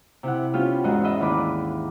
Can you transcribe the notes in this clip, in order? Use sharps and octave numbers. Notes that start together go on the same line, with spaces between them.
C3 E4 F#5
B3 C#4 F4 G4
E2 G#2 F#4 D#5
D#5 E5 B5
D#2 E3 D4 B4 D6